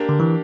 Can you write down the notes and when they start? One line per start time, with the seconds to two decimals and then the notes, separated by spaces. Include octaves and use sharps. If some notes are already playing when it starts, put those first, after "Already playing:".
Already playing: A#3 D4 G4 A#4
0.09 D3
0.20 E3